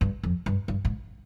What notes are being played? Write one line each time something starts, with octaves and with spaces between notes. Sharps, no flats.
G2
F2
G2
G2
G#2